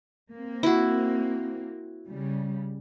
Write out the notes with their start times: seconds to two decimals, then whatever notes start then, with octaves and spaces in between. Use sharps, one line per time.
0.32 A#3 C4
0.63 E4 F#4
2.08 C#3 G3